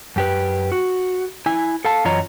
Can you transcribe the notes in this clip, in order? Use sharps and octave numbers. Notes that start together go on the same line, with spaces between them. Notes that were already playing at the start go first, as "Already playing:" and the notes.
F#2 G4 B4
F#4
E4 G#5
A4 F5 A5
F#2 E3 F4 C#5 D#5 A#5